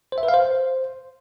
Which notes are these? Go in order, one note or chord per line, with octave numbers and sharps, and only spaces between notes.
C5
E5
B4
F5
C5